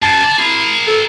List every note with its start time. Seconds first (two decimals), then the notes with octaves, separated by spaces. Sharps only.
0.02 F#2 A5
0.24 A4 D5
0.38 E4 G#4 A#4
0.87 A4